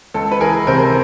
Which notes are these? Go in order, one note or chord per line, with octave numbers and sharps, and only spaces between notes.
C#2 A4
B4
E3 G#4 A#4
C3 A#4 C5